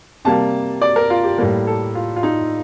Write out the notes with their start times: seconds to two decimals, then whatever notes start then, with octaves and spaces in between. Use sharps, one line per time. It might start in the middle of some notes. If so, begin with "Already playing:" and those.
0.25 C3 G3 A#3 A5
0.82 D5
0.96 A#4
1.10 F4
1.24 G4
1.38 A2 G3 A#3 A#4
1.67 A4
1.95 F4
2.16 F4
2.23 D#4